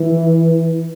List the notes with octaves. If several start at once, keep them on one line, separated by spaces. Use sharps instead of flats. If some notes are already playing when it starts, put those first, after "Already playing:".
Already playing: E3